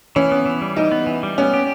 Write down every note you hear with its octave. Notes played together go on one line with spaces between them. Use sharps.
E3 C#4
B3
E3
G3
E3 D#4
B3
E3
G3
B3 C#4
G4